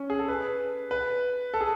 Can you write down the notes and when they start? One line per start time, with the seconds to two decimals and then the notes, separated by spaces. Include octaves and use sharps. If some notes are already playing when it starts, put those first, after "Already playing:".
Already playing: C#4
0.10 G#4
0.19 A4
0.28 B4
0.91 B4
1.54 A4
1.61 G#4